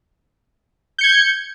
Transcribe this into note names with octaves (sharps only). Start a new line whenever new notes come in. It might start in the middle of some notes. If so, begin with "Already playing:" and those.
G6 G#6 C#7